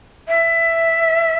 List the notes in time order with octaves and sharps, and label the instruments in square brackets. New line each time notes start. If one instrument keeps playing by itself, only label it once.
[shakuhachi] E5